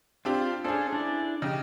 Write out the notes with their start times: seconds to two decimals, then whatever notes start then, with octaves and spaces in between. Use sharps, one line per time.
0.25 C4 D4 F4 G4
0.64 C#4 D4 G#4 A4 C5
0.93 D4 E4 D5
1.42 C#3 D#4 G4